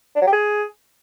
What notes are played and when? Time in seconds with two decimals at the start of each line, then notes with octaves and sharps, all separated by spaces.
0.15 D4
0.21 F#3
0.27 G4
0.33 G#4